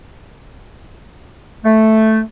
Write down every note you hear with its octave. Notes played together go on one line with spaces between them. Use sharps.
A3